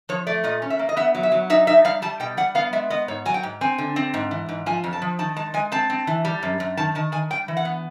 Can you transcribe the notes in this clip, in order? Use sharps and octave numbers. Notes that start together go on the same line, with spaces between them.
F3 C#5
A3 D5
A#2 D#5
C#4
E5
A#3
D#5
B3 E5
F#3
E5
F#3
D#4 E5
D#4 E5
G3 F5
G3 A5
B2 G5
G3 F#5
B3 F5
G#3 E5
B3 D#5
G#2 C#5
F#3 G#5
G5
G#2
C4 G#5
D3
C4
G#2
E3
G#2
F3 G#5
F2
A5
F3
D#3 A5
G#3 A5
G#3 G#5
C4 A5
C4
E3
G3
F#2
F#2
D#3 A5
D#3 A5
D#3 G#5
G3 G5
E3
F#5
B3